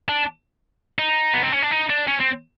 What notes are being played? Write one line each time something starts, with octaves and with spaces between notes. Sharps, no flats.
D4
D#4
B3
C4
C#4
D4
D#4
D4
C#4
C4